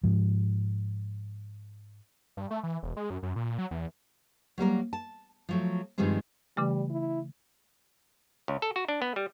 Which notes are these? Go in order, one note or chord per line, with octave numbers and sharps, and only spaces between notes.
G#2 F3
G2
A3
E3
E1
G#3
F#2
F#2
A#2
F#3
E2
F#3 G3 A#3 A#4
A5
F3 F#3 A3
G2 D#3 F3 G3 G#3 C4
C#3 E3 G3 A3
E4
C#2
A4
F#4
D4
B3
G3